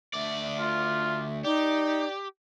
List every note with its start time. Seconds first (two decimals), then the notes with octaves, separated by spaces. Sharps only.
0.14 D2 D5 E5
0.59 F4
1.45 D#4 G4 D5